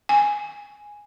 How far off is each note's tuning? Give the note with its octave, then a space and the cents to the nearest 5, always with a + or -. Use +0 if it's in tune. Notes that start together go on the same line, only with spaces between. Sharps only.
G#5 -5